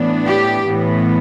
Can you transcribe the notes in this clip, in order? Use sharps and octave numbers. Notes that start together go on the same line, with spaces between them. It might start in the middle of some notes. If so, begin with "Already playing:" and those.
Already playing: A2 E3 B3 D4
G4
A2 E3 B3